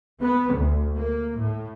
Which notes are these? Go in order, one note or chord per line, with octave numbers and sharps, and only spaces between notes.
B3
D2
A#3
A2